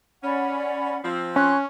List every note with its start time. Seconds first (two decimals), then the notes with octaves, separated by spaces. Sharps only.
0.24 C#4 D5 F#5 B5
1.04 F3 C4
1.36 C#4 C6 F#6